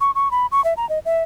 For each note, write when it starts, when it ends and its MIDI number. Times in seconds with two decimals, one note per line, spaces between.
0.01 0.11 85
0.15 0.31 85
0.31 0.46 83
0.52 0.63 85
0.64 0.74 76
0.77 0.88 82
0.89 0.99 75
1.05 1.23 76